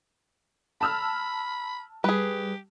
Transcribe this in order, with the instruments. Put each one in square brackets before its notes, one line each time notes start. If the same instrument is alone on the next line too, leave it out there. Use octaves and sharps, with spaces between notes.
[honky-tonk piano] A5 E6 F6 [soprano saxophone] B5
[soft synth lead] G3 [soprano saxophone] G4 [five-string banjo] G#4 B4